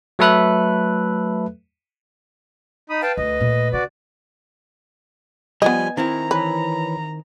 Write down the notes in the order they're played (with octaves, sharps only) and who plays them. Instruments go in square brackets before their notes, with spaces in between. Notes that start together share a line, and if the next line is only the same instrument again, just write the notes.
[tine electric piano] F#3 A3 A4 B4 E5 F#6
[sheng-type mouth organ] D#4 B5 D#6
[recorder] B4 [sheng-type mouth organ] F5 G5 A5
[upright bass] D2 [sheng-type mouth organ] D#5
[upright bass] A#2 A3
[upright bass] C#3 [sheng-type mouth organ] F#4 D5
[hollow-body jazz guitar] F3 G3 [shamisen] B3 D#5 [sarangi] G#5
[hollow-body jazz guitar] D#3 C4 E4 [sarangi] A#5
[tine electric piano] E3 C#5 B5 [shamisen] B4